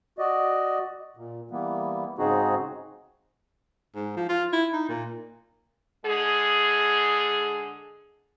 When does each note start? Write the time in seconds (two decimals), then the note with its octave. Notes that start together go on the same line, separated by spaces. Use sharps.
0.19 F#4 D5 D#5
1.17 A#2
1.51 E3 G3 A#3 B3
2.18 G#2 C#3 C4 D#4 F#4 G#4
3.96 G#2
4.17 F3
4.29 F4
4.53 E4
4.73 D#4
4.89 A#2
6.05 D3 G#3 G#4